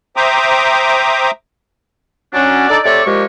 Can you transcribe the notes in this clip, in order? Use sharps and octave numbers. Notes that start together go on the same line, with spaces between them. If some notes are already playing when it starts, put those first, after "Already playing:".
C5 E5 G5 A#5 D6 D#6
F#3 C#4 D4
D4 D#4 A4 D5
C3 A3 A4 C#5 D5
A#2 F3 G#3 G4 C#6